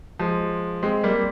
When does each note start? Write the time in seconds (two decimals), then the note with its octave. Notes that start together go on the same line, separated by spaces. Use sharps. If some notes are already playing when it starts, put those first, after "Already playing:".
0.19 F3 G#3
0.83 G#3 C4
1.04 G3 A#3